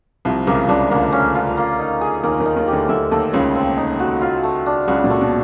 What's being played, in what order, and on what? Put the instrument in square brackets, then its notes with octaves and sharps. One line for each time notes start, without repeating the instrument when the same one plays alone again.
[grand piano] C2 C3 [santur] F3
[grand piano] C#2 C#3 [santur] A#3
[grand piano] C#2 C#3 [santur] D4
[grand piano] D2 D3 [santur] A#3
[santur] C#4
F4
A#3
D#4
G#4
[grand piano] D#2 D#3 [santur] A#3
[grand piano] D#2 D#3
[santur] D#4
[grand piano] D#2 D#3
[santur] G4
[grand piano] D2 D3
[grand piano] D2 D3 [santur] E5
[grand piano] D#2 D#3 [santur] A4
[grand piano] C#2 C#3 [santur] C#5
[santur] C4
D#4
F#4
F4
A3
D4
[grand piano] C#2 C#3 [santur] F#4
[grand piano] A#2
[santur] A3
[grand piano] B2